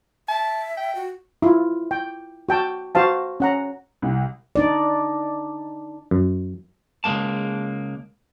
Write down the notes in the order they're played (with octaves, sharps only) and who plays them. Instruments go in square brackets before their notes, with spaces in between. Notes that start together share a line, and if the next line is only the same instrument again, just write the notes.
[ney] E5 [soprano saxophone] A5
[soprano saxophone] G5
[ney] F#4
[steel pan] E4 F4
G5
F#4 G5 A5
F#4 C5 F5 A5
C#4 F#5 A#5
[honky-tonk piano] C2
[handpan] D4 D#4 D5
[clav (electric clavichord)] F#2
[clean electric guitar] C#2 E3 G#3 A#3 A5